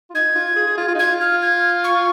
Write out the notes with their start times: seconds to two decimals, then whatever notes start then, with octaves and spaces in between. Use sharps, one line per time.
0.10 F4
0.15 D#4 G#6
0.36 F4
0.57 G#4
0.67 G#4
0.78 F4
0.89 F4
0.95 D#4
0.99 F4 G#6
1.21 F6
1.42 G#6
1.84 C#6